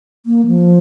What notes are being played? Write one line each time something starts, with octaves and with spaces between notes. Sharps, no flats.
A#3
F3